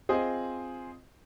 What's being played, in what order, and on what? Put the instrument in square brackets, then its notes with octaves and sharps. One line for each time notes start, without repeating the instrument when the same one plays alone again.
[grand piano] C4 F4 G#4 C5 D#5